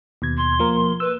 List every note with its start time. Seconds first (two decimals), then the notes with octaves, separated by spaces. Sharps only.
0.22 D#2 B2 G#6
0.37 C6
0.59 F3 A#3 A#4
1.00 B4 E6